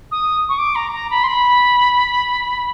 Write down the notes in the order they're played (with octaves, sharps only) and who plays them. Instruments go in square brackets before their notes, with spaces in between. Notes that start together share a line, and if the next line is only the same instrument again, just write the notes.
[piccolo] D#6
C#6
D6
A#5
A#5
B5
C6
B5